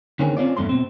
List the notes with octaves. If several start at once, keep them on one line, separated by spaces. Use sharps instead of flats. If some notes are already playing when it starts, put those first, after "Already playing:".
D3 D#3 A#3 C4 C#4 G#4
C4 C#4 F4 D5
E2 G2 A3 C6
B2 C4